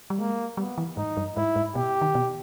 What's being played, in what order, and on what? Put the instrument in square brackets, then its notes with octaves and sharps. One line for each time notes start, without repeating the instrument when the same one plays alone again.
[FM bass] G3
[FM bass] G#3 [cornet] A#3
[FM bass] G3 [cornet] B3
[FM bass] E3
[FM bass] G#2 [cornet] D#4
[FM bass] G2
[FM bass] G#2 [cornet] E4
[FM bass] G#2
[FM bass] B2 [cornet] G4
[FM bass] D#3
B2